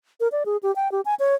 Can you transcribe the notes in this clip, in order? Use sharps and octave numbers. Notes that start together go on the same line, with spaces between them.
A#4
D5
G#4
G4
G5
G4
G#5
C#5